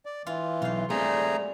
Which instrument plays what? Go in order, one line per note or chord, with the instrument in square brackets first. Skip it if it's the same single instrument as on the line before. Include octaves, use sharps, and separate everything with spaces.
[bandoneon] D5
[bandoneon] E3 [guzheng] F4
[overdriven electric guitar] B1 [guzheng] F4 F5
[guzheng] G3 [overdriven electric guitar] A3 C4 [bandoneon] G#4 A#5